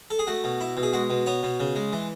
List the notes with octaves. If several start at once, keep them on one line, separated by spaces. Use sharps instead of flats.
A4
G#4
A3 F#4
B2
E4
B2
G#4
G#3 F#4
B2
B3 C#5
B2
C#3
G#3
E3